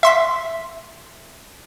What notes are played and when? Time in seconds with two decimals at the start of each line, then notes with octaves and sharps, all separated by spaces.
0.03 E5 C6 B6